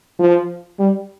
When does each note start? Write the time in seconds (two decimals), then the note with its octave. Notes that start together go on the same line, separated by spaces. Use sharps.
0.19 F3
0.79 G3